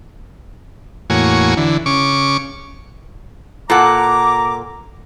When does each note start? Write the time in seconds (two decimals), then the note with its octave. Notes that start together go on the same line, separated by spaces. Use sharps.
1.10 E2 A2 A#3 F#4 C#5 G#5
1.57 D3 E3
1.86 C#3 C#6 D6
3.70 A#2 A4 F#5 A#5 D6